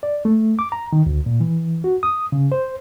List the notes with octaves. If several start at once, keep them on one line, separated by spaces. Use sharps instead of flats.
D5
A3
D6
A#5
D#3
D2
A#2
E3
F#4
D#6
C#3
C5